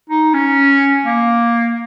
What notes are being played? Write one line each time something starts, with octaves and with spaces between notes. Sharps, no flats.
D#4
C#4
A#3